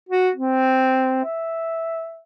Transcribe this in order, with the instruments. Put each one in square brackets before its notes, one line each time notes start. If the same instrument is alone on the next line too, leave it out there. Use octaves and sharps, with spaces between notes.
[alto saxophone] F#4
C4
E5